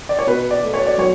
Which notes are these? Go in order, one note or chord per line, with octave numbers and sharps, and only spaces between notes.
D5
C#5
B2 B4
D5
A3
C#5
D5
F#3 C#5